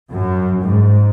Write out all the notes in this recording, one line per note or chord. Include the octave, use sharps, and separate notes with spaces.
F#2
G#2